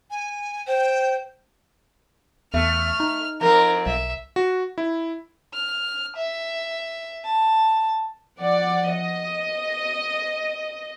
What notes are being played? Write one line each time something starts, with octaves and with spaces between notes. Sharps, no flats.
G#5
C5 G5
E2 A3 F6
D#4
F2 C4 A#4
B1 E5
F#4
E4
F6
E5
A5
F3 D5 F#5
D#5